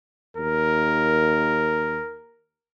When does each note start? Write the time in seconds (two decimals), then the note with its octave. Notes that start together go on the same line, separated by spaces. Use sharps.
0.37 D#2 A#4